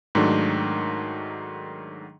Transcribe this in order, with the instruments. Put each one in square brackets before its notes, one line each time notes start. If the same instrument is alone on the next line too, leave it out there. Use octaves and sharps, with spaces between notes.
[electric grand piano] G#2 D#3 F#3 A3 D4